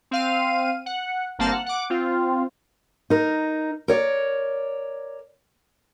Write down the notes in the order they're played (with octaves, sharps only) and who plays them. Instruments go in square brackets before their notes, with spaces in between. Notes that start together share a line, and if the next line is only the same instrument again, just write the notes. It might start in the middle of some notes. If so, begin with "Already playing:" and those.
[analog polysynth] C4 F5 D#7
F#5
G1 A#3 C4 A5 F6
F#5
F#5 D6
C4 F4
[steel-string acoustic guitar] D#4 A#4
A#4 C#5 D5